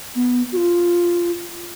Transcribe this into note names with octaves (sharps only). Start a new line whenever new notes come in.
B3
F#4
F4